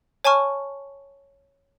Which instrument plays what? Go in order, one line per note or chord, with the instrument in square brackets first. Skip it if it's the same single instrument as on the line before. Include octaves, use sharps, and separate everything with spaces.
[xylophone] C#5 G#5 A5 C#6 F6